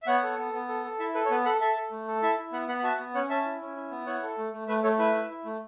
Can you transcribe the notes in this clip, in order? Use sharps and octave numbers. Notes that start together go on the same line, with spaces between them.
E5
B3 C#5 F#5
A4
B3
B3
A4
A4
E4 E5 A5
A4 B4
C#5
B3 B4
A4 F#5 B5
A4 E5 A5
A4
A3
A4
E4 E5 A5
E4
B3 F#5 B5
B3 F#5 B5
B5
F#4 E5 A5
B3
C#4 C#5 F#5
C#4 E5 A5
E4
C#4
E4
B3
E4 C#5 F#5
A4
A3
A3
A3 B4 E5
A3 A4 C#5
E4 B4 E5
E4
E4
A3